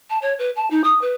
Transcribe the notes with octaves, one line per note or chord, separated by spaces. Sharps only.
A5
C#5
B4
A5
D#4
D#6
B4